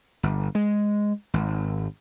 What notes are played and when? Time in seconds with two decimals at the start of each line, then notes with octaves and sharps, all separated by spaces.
0.23 G1
0.55 G#3
1.34 G#1